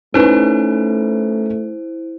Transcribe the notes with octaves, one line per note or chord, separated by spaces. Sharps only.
A3 C#4 D#4 E4 B4 C5